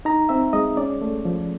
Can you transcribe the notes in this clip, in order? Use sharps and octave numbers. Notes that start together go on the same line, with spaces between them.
D#4 A#5
C4 E5
G#3 D#5
C#4 D5
A3
F3